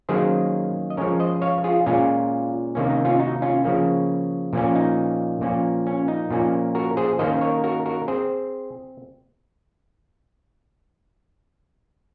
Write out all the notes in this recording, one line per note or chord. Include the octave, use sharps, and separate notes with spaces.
D#3 F#3 A#3 C#4 G#4 C5
D#5
F3 G#3 C#4 A#4 C#5
C5 D#5
C#5 F5
F4 G#4
A#2 G#3 C#4 F4
C3 D#3 A#3 C#4
D#4
C#4 F4
D#4 F#4
C#4 F4
C#3 F3 A#3 C#4
A#2 F3 A#3 C#4
D#4
A#2 F3 A#3 C#4
C#4
D#4
A#2 F3 A#3 C#4
F#4 A#4
G#4 C5
D#3 A#3 C#4 C5 D#5
A#4 C#5
F#4 A#4
F#4 A#4
C4 G#4 C5